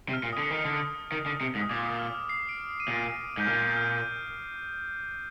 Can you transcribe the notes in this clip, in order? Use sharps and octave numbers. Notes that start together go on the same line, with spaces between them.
C3
F6
A#2
D3 D#6
D#3
D3
D#3
D3
C3
G#2
D#6
A#2 D6
D#6
F6
F6
C7
D7
D#7
A#2 D7
D#7
G#2 G6
A#2 F6
G6
F6